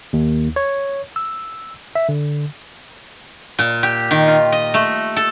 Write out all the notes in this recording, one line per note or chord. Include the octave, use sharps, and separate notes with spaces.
D#2
C#5
E6
E5
D3
A#2
G4
D#3
F4
D#5
A3
A4